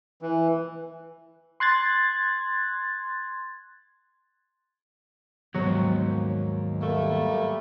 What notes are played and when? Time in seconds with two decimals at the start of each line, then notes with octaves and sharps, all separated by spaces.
0.22 E3
1.60 C6 F#6 G#6 A6
5.54 D#2 G#2 F#3 B3 C5
6.82 G3 A3 A#3